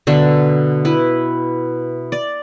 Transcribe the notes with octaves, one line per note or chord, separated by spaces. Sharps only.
B2 D3 E5
E4 B4
D5